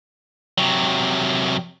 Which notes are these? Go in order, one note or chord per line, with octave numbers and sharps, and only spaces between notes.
C3 F#3